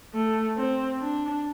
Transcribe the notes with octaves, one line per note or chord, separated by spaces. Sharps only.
A3
C4
D4